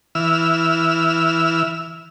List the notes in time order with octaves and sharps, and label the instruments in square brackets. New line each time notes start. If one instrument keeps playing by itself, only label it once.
[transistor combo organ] E3 E6 F6